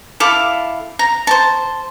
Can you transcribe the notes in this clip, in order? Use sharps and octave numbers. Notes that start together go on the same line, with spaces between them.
E4 A4 F5 D6
A#5
C5 A5